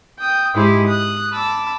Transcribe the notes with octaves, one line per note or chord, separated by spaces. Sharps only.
G5 D#6
G#2 D#4 E4 G4 G#4 C5
D#6 F#6
A5 B5 D6 E6